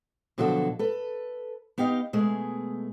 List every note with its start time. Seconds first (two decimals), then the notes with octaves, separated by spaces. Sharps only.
0.38 B2 D3 F3 F#3 F#4 A4
0.79 A4 B4
1.78 B3 D#4 G4 D#5 F5
2.13 B2 G#3 A3 G#4